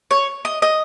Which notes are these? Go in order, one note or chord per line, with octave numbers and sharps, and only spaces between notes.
C#5
D#5
D#5